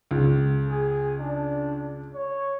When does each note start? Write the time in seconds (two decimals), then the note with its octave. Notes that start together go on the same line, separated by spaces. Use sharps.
0.11 C#2
0.69 G#4
1.20 D4
2.15 C#5